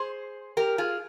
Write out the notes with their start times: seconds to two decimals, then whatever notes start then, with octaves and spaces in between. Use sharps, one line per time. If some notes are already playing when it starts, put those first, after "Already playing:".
Already playing: G#4 C5
0.57 G4 A#4
0.78 F4 G#4